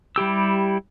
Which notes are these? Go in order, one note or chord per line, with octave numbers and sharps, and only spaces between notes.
G3 E4 G4 E6